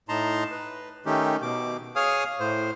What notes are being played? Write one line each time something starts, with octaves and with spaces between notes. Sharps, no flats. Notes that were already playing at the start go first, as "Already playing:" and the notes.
A2 D#4 A5 A#5 C6
B4
D#3 A3 C#4 D#4 G4
B2 D6
G#4 C#5 F5 G#5 D#6 F6
A2 C5